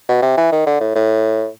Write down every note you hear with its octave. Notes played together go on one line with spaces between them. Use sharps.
B2
C3
E3
D#3
D3
A2
A2